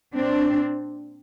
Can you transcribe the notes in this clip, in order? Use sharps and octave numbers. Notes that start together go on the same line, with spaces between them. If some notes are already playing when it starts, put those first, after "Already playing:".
A#2 C4 D4